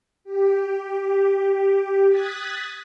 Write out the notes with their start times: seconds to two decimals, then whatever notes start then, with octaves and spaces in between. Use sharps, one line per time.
0.24 G4
2.09 D#6 F#6 G#6 A6 B6